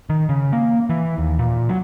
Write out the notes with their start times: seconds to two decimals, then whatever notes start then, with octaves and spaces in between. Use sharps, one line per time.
0.10 D#3
0.29 C#3
0.53 A#3
0.90 E3
1.18 D#2
1.39 A#2
1.69 F#3